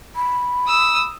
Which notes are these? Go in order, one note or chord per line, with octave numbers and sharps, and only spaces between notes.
B5
D#6 E6